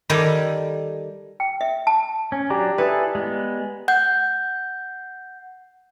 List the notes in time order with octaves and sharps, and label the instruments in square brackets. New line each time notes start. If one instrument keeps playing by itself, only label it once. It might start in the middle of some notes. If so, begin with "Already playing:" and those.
[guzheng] D#3 G3 G4 A4 C#5 D5
[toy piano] G5
E5
A5
[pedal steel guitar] C#4
[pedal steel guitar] F#3 D4 [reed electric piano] G4 D5 A#5
[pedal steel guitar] E4 G#4 A4 [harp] B4
[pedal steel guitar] G#3 B3
[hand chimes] F#5 G6